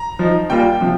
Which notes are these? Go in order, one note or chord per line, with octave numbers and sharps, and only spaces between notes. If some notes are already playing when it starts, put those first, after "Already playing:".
Already playing: A#5
F3 D#4
A#2 G3 A#3 F4 G5
C3 F3